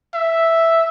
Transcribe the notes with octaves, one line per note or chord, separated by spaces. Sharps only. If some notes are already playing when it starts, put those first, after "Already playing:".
E5